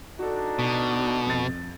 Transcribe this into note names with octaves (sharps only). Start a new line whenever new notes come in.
D4 D#4 F#4 A4
B2
F2 A6